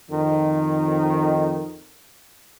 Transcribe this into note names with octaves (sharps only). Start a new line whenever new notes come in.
F2 D#3